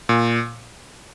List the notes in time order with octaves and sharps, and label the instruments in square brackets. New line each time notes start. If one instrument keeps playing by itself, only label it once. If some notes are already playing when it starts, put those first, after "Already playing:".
[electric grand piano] A#2